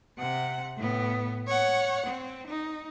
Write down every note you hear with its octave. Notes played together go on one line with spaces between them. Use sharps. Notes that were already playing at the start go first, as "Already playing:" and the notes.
C3 F#5
A2 B3
C#5 F#5
C4
D#4